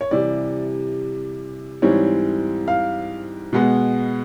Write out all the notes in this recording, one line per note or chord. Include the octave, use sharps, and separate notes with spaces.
C#5
C3 E3 G3 D5
G#2 E3 G3 C4 C#5
F5
B2 G#3 B3